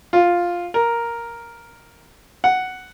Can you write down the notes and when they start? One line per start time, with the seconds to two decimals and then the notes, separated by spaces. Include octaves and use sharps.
0.13 F4
0.74 A#4
2.44 F#5